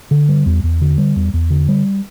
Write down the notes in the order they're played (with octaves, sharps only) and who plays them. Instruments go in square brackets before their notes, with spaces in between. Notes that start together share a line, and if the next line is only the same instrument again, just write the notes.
[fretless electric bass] D3
G3
E2
E2
D3
G3
E2
E2
D3
G3